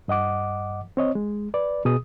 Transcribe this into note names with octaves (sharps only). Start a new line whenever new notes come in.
G2 D#5 F#5 D6
C4 C#5 D#5
G#3
B4 D5
B2 G#4 D#6